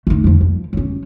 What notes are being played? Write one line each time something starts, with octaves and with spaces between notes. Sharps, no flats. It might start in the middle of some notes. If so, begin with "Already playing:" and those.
A3 D#4
F2 F3
F3
F#3 C#4